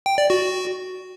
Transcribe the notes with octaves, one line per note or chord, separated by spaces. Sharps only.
G5
D5
F#4